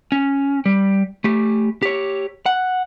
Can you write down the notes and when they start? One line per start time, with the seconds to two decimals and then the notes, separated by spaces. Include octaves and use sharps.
0.12 C#4
0.66 G3
1.24 A3 G4
1.82 G4 C#5
2.46 F#5